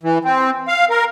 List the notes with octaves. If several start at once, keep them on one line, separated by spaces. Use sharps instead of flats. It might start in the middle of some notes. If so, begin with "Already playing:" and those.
E3
C4
F5
A#4